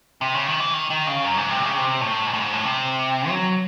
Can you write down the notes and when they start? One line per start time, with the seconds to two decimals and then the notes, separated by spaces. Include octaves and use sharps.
0.21 C3
0.34 C#3
0.47 D#3
0.60 E3
0.74 D#3
0.90 D#3
1.07 C#3
1.24 F#2
1.37 G#2
1.50 C3
1.63 C#3
1.76 C3
2.01 A2
2.27 G#2
2.34 A2
2.40 G#2
2.53 A2
2.65 C3
3.29 F#3